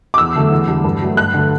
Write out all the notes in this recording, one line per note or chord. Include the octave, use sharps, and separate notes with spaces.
D6
E2 E6
D3 F#3 A3
E2
D3 G3
G2
F#3 A3
G2 F#6
D3 A3